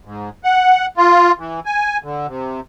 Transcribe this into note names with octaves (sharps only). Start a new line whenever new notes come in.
G#2
F#5
F4
E3
G#5
D3
C3